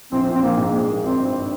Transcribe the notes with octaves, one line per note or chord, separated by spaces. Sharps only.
A#1 C4
F3
C4
A#1 A#3
G#2
G#3
D#3
G#1 C4
G2